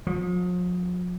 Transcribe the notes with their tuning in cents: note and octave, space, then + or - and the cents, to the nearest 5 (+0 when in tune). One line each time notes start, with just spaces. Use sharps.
F3 +45